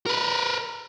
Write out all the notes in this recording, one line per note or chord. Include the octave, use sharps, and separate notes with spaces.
A#4 B4